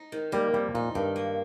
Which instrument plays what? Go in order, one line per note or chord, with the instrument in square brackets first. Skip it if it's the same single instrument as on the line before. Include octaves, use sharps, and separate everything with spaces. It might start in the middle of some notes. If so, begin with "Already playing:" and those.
Already playing: [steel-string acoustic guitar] D#4
D#3
[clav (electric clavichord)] G3 [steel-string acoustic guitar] A#3
[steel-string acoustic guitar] F2 [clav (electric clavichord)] G3
[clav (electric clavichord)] A#2 [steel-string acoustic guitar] D#4
[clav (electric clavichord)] G2 [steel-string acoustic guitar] D#3
[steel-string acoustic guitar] A#3